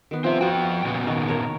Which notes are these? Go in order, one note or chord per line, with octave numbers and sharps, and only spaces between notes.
D#3 B3
F3 C4 E5
F3 F#4 G5
A#2 C#3 B3
D#3 A#4
A#4 C#5 A5